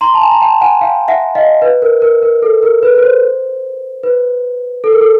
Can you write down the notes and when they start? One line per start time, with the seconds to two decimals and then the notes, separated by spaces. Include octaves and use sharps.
0.01 A#5 C6
0.14 A5
0.21 G#5 A#5
0.31 A#5
0.41 G5 A5
0.61 F#5 G#5
0.81 F5 G5
1.08 E5 F#5
1.35 D#5 F5
1.62 B4
1.82 A#4
2.02 A#4
2.22 A#4
2.42 A4
2.63 A#4
2.83 B4
2.95 B4
3.03 C5
4.03 B4
4.84 A4
4.93 A#4
5.01 A4